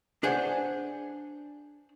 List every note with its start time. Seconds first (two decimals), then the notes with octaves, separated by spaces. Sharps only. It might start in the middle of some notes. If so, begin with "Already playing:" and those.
0.23 D4 G#4 C5 F#5